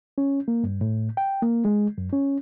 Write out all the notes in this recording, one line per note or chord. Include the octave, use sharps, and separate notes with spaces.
C#4
A#3
G2
A2
G5
A#3
G#3
F#2
C#4